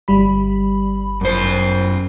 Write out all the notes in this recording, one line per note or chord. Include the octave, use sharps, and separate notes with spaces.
G1 G3 B5
F#2 C5